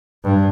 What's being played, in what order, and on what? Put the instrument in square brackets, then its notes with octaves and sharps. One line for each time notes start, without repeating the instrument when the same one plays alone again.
[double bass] G2